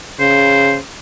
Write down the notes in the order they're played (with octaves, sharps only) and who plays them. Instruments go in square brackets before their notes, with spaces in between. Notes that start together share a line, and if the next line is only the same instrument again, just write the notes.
[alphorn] C#3 [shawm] C5